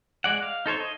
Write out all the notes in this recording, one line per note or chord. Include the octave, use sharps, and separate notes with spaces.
G#3 D5 F#5
F5
D#4 A4 C5 C#5
D#5